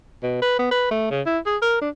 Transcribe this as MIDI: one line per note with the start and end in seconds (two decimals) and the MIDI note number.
0.23 0.37 47
0.42 0.54 71
0.59 0.69 59
0.71 0.88 71
0.91 1.07 57
1.10 1.21 49
1.26 1.38 64
1.46 1.57 68
1.62 1.80 70
1.81 1.89 62